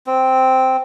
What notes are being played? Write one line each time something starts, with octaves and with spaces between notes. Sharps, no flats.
C4